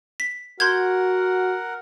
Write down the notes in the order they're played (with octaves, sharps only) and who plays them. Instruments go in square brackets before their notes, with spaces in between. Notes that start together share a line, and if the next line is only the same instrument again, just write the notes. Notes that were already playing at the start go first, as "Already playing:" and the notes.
[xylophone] B6
[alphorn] F#4 [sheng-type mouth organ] A#4 F#5 [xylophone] C6 G6 G#6